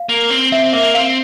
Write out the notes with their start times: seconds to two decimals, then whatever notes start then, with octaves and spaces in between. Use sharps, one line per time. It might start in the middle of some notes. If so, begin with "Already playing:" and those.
Already playing: F5
0.09 A#3
0.30 C4
0.52 C4 E5
0.73 A#3 E5
0.94 C4 F5